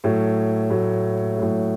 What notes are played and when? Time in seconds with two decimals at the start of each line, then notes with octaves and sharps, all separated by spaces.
0.04 A2 F#3 A3
0.70 A2 F#3 A3
1.37 A2 F#3 A3